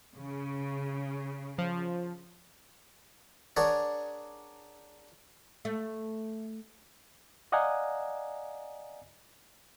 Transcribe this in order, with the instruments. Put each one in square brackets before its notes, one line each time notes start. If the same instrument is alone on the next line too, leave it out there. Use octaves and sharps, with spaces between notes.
[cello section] C#3
[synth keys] F3
[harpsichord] D4 G#4 A#4 C#5 D5 F#5
[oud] A3
[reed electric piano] D5 D#5 F5 F#5 G#5 A#5